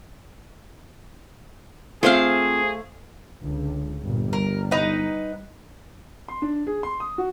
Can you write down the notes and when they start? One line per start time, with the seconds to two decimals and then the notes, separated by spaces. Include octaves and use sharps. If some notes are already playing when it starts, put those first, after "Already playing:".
2.03 A3 C4 F4 G#4 C5 F5
3.43 C#2 D3
4.03 G1 G2 A#2
4.33 G3 A#4
4.71 D#4 B4 F#5
6.28 C6
6.42 D4
6.67 G#4
6.83 C6
7.00 D#6
7.18 F#4